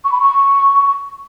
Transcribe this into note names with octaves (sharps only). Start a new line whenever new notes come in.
C#6
B5
C#6